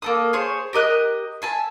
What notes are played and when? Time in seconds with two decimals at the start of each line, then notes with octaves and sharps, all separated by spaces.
0.02 A#3 A4 D#6
0.33 G#4 C5 C#5
0.73 G4 A#4 D#5 F#6
1.42 E5 G#5 A5